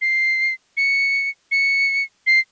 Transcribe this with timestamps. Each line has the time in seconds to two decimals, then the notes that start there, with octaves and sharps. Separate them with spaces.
0.02 C7
0.77 C#7
1.52 C#7
2.27 C7